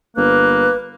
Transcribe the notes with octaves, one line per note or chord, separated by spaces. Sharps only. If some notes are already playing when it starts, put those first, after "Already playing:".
G1 A#3 B4 F#6